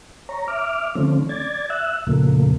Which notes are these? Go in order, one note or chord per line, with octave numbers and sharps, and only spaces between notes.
C#5 A#5
E5 D6 F6
D3 D#3 F3 A3 C4 C#4
D5 G#6 A6
E5 E6 F#6
F2 A#2 C#3 F3 A3 A#3